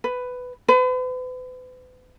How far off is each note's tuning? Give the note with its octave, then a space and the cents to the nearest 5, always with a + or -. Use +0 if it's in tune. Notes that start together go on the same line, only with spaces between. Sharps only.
B4 +10
B4 +40